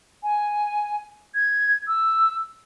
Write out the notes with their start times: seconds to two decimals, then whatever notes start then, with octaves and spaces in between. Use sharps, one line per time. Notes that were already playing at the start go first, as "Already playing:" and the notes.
0.23 G#5
1.35 G#6
1.88 E6